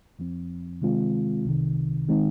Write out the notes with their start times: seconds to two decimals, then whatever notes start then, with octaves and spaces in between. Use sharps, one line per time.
0.19 F2 F3 C4
0.82 C3 D#3 G#3 C4 F4
1.45 C2 C3 D#3
2.09 D#3 G#3 C4 D#4